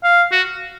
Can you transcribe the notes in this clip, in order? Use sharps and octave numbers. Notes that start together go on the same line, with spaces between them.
F5
F#4